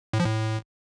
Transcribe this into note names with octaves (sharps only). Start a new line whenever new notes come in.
A2
F3
A2